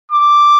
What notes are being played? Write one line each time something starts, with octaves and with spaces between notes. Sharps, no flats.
D6